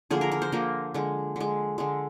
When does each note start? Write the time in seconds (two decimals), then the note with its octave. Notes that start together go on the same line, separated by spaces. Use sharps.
0.10 D3 F3 A#3 G#4
0.21 A#4
0.32 A#4
0.42 C5
0.52 D3 F3 A#3
0.94 D3 G#3
1.36 D3 G#3
1.78 D3 G#3